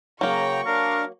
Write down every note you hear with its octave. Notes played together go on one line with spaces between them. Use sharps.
C#3 F#3 A#3 G5 A#5 C#6
D4 A#4 F5